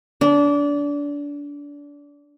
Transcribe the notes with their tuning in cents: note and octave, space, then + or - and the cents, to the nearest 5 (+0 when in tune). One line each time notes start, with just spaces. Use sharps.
D4 -25